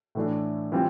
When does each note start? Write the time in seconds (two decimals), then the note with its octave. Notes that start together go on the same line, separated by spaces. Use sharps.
0.15 A2 E3 A3 D4
0.72 E3 G3 C4 F4